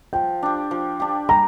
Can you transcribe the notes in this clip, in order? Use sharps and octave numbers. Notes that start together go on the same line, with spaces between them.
F3 G5
D4 G4
F3
D4 G4
G3 A#5